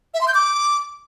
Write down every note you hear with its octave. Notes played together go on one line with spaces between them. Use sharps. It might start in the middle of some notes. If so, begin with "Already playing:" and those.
E5
C6
G6
D6